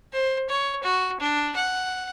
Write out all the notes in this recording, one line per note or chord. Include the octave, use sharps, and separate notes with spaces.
C5
C#5
F#4
D4
F#5